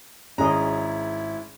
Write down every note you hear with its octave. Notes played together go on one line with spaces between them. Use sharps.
G#1 C#4 E4 G#4 D#5 A#5